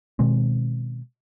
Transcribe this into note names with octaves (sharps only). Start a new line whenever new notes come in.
B2 D#3 G#3 C4